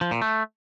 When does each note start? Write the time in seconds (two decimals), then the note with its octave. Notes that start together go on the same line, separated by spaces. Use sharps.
0.01 F3
0.11 A#2
0.22 A3